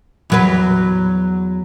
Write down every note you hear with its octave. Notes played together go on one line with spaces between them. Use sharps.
E2 F#3 B4